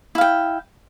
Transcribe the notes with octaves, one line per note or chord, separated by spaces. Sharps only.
E4 F5 G5